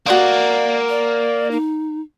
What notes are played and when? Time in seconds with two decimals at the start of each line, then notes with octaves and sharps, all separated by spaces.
0.06 A#3 F#4 C5 D5 D#6
0.89 D5
1.51 D#4